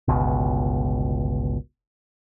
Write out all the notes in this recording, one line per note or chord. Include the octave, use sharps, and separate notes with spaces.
G1 C#2 B2